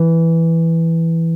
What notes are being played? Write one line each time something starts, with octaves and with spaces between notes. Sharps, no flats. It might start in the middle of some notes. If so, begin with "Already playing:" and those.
Already playing: E3